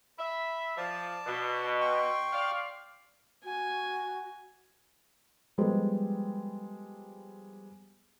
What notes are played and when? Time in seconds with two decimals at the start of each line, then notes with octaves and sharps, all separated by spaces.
0.18 E5 B5
0.77 F3 D5 A5
1.26 B2
1.81 G5 C6 C#6
2.33 D5 F5
3.44 F#4 G#5
5.58 F3 G3 G#3 B3 A4 C5